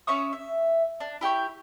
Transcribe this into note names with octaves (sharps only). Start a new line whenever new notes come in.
C#4 E5 C#6 D#6
E5
D4
E4 G4 G5 C#6